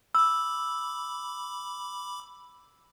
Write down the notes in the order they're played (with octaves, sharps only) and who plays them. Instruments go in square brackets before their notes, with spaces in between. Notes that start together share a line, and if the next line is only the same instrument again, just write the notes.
[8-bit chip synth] B5 D6 [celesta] E6